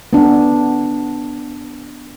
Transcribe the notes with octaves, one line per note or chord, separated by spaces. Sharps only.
B3 D4